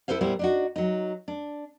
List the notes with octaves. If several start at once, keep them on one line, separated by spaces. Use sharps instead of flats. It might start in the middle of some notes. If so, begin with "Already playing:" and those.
E4 A4 B4 C5 F5
A#2 G3 B3 E4 C5
D4 D#4 F#4
F#3 D#4
D4